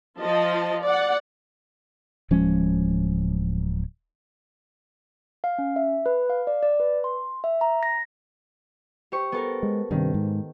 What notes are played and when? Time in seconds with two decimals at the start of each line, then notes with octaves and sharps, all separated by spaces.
0.20 F3 F4 D#5 A5
0.84 D5 F#5
2.31 D1 F3 G#3 C#4
5.44 F5
5.58 C#4
5.76 E5
6.06 B4
6.29 F5
6.47 D5
6.63 D5
6.80 B4
7.04 C6
7.44 E5
7.61 A#5
7.83 A#6
9.12 G4 C5 C#6
9.32 B3 A4 A#4
9.63 G#3
9.91 G2 C3 D#3
10.14 G#2